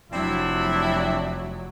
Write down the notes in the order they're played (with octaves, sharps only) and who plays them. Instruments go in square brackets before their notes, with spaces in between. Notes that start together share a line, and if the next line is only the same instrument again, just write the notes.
[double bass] F1 F#3 [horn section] C4 D4 E4